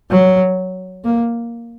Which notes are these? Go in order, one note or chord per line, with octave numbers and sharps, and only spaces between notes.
F#3
A#3